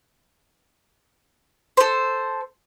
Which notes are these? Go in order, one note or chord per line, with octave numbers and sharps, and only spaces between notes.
A4 C5